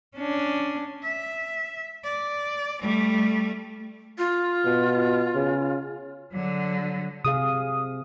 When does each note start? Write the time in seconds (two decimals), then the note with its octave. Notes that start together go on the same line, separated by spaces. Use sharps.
0.17 C#4 D4
1.04 E5
2.04 D5
2.82 G3 A3
4.18 F4
4.65 B2
5.35 C#3
6.32 D3 F#3
7.25 C3 G#4 F5 D#6